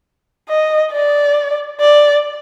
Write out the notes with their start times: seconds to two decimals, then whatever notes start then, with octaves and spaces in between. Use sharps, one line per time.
0.49 D#5
0.92 D5
1.81 D5